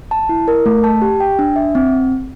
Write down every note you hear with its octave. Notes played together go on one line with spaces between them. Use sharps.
A5
E4
A#4
A3
A5
G4
G5
D4
E5
C4